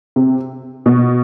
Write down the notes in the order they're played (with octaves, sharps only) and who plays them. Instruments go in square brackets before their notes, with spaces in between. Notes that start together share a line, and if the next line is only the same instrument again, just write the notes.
[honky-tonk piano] C3
B2